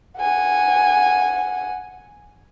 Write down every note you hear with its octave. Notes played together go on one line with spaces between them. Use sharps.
F#5 G#5